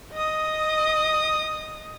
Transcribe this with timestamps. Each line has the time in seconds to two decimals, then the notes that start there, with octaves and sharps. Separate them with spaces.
0.13 D#5 D#6